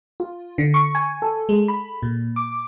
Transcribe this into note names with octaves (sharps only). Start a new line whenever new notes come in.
F4
D3
C#6
G#5
A4
G#3
B5
A#2
D6